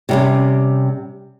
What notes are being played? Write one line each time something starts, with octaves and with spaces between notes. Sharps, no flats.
C3 G3 C#4